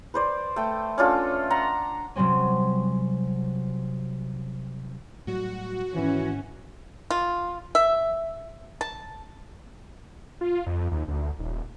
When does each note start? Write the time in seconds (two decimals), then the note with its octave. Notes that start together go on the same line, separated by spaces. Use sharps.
0.14 B4 C5 D5
0.56 A3 G5
0.98 C#4 D4 F4 A4
1.50 F#5 A#5 C6
2.16 C3 F#3 G3 C4 C#4
5.27 A2 F#3 G3 F#4
5.95 G#2 D#3 E3 C#4
7.10 F4
7.75 E5
8.81 A5
10.41 F4
10.67 F2
10.92 D#2
11.08 D2
11.39 D#1